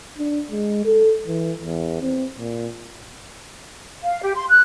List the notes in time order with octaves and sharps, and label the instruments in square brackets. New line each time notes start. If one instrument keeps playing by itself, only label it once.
[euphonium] D4
G#3
A4
E3
E2
C4
A#2
[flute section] F5
G4
C6
F#6